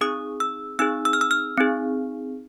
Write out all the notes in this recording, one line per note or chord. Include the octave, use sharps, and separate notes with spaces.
C4 D#4 G#4 D#6
E6
C4 D#4 G#4 E6
E6
F6
E6
F6
C4 D#4 G#4